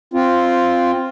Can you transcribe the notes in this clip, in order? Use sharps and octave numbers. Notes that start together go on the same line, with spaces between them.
C4 F4